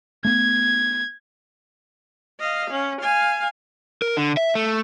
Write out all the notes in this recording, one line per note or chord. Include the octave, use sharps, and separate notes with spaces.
A3 B3 G#6
D#5 F5
C#4
F5 G#5
A#4
D3
E5
A3